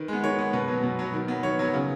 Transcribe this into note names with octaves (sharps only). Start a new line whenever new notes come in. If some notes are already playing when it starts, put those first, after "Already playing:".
Already playing: D#3 B4
G#3 B3
D#3 C#5
G#3 B3
B2 B4
F#3 B3
B2
F#3 B3
D#3
F#3 B3
D#3 C#5
F#3 B3
C#3